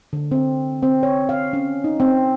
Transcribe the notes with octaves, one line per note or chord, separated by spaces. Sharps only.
D3
C4
C4
C#5
F5
C#4
D#4
C4